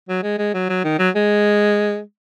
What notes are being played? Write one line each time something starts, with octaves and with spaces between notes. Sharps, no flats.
F#3
G#3
G#3
F#3
F#3
D#3
F#3
G#3